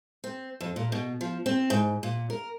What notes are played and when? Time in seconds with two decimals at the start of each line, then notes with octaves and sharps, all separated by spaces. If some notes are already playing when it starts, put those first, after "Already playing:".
0.24 C4
0.61 F2
0.76 A#2
0.92 B2
1.21 F3
1.46 C4
1.70 G#2
2.03 A#2
2.30 A#4